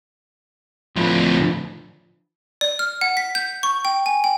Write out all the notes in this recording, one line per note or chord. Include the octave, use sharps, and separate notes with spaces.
D2 A2 F3 B4
D5
F6
F#5
B6
G6
C#6
G5
G#5
G5